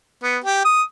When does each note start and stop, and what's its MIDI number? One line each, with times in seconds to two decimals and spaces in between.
0.23 0.38 59
0.44 0.63 67
0.65 0.82 87